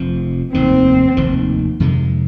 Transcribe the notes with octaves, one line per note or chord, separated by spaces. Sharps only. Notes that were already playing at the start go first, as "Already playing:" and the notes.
Already playing: F1 F2 F3 C4
F1 D#2 D#3 C4
F1 D#2 D#3
F2 C3 D#3 G#3